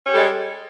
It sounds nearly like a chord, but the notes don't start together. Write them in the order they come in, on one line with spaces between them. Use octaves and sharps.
C#4 G4 A4 G3 G#3